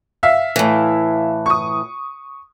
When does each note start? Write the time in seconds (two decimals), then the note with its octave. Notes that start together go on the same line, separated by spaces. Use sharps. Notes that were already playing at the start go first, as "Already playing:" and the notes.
0.23 E5 F5
0.56 A2 E3
1.46 C#6 D#6